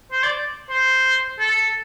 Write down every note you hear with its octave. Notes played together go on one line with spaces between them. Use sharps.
C5
D5
C5
A4